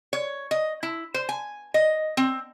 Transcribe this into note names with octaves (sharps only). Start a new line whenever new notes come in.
C#5
D#5
E4
C5
G#5
D#5
C4